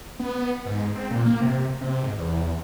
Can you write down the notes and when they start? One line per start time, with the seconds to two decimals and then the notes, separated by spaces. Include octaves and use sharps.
0.20 B3
0.66 G#2
0.96 C4
1.11 A#2
1.26 A#3
1.41 C3
1.81 C3
2.03 G#2
2.18 E2